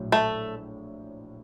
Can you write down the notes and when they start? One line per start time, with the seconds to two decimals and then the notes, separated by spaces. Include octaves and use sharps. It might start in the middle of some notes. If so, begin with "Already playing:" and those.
Already playing: A#1 A2 F#3
0.12 A3